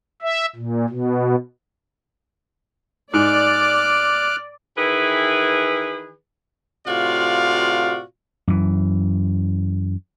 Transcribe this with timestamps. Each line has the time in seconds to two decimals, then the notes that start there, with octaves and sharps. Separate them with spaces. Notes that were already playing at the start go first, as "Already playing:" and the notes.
0.22 E5
0.56 A#2
0.90 B2
3.14 G#2 D5 D6 F6 F#6
4.77 D#3 E3 E4 G#4 B4
6.87 A2 C3 F4 F#4 D5 F5
8.48 F#2 E3